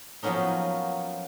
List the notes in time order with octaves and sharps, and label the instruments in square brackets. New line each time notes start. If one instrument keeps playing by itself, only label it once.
[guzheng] F3 F#3 A#3 B3 C#4 D#4